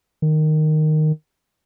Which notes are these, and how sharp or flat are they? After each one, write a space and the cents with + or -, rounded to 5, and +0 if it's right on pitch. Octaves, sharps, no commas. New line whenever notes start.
D#3 -10